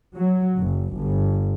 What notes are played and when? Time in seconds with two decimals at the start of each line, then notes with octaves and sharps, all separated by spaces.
0.15 F#3
0.59 F#1
0.95 G1